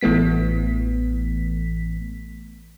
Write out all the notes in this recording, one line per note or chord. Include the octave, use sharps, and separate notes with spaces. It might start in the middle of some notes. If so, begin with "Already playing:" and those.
A1 E3 A3 B3 B6